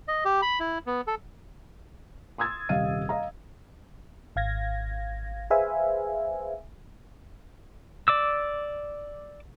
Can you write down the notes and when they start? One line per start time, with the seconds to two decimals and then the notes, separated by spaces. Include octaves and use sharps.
0.08 D#5
0.25 G4
0.42 B5
0.60 E4
0.87 B3
1.07 A4
2.38 C6 D#6 E6 G#6 A6
2.69 D#1 C3 D#5 F5 D#7
3.09 D#5 F5 A#5
4.36 G#1 F5 G#6 A#6
5.50 G#4 B4 C5 E5 F5 G#5
8.08 D5 D6 E6